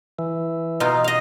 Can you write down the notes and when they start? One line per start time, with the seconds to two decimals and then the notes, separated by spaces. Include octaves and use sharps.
0.19 E3
0.80 B2 D#4 F4
1.04 D#5 F5